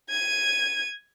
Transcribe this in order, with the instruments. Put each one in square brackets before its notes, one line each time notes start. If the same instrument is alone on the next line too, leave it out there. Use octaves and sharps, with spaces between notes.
[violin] G#6 D#7